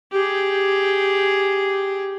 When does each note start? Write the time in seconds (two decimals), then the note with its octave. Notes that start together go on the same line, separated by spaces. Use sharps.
0.12 G4 G#4